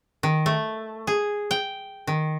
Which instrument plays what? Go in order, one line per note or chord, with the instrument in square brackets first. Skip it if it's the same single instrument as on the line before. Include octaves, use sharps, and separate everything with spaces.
[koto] D#3
A3
G#4
G5
D#3